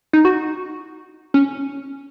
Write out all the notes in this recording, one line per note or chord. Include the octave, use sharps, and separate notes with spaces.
D#4
F#4
C#4